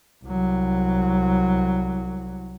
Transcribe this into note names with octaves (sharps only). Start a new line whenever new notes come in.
C2 F#3